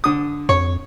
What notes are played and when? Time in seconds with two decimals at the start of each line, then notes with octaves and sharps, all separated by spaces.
0.04 D3 D#6
0.49 F2 C#5